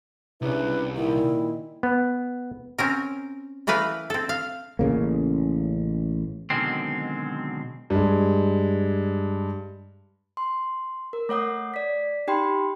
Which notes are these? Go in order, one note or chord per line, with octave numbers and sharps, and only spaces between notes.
C2 C#3 D4 E4 B4
A#2 D#3 E4
B3
C4 C#4 A#4
E3 A3 A#4 B4 F5
C4 A4
F5
A1 C#3 A#3
B2 D3 D#3 F#3 G#3 C4
G2 G#3
C6
A#4
A3 C#5 F#5 D#6
D5 B6
D#4 G4 G5 B5 C6